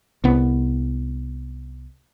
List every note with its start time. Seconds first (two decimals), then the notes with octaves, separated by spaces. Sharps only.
0.24 C2 B3